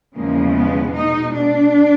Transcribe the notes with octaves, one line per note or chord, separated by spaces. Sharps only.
E2 C#3 F3 G#3 A#3
B3
B2 G#3 D#4
D4